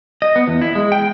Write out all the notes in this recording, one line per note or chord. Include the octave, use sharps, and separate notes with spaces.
D#5
B3
E2
E4
G#3
G5